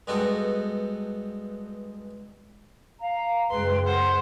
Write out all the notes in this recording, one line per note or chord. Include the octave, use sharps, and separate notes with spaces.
G2 G#3 B3 F#4 A4 G5
F5 A#5
C#2 F#2 G#3 B4 G5 C6
A#4 C5 F#5